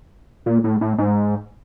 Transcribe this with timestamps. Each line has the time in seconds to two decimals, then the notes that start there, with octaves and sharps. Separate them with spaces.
0.46 A#2
0.64 A2
0.81 A2
0.98 G#2